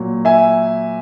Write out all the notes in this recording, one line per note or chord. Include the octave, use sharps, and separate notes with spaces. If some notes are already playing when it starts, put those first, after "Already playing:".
Already playing: A#2 F#3
E5 G#5